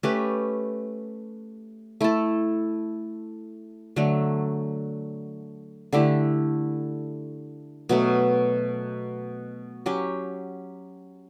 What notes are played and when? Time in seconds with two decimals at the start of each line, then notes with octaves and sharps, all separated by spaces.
0.03 A3 C#4 G4 B4
2.01 A3 E4 A4
3.96 D3 F#3 A3
5.93 D3 A3 E4 G4
7.89 B2 F#3 A3
9.86 F#3 C#4 G4